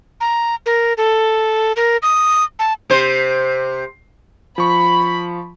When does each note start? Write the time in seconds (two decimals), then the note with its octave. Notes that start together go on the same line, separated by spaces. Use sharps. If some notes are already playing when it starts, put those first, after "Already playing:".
0.20 A#5
0.66 A#4
0.97 A4
1.76 A#4
2.02 D#6
2.59 A5
2.90 C3 C5
4.58 F3 B5 C#6